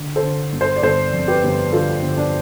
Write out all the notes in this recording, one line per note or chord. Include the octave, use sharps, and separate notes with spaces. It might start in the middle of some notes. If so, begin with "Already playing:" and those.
Already playing: D3
A4 C5
D3
G1
A4 C5
D5
G1 A4 C5
F2
G4 B4
G1
D3 F4 A4
G1
D4